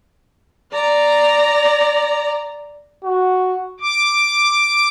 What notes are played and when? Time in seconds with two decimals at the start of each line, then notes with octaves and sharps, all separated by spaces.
0.72 D5 A#5
3.04 F#4
3.80 D6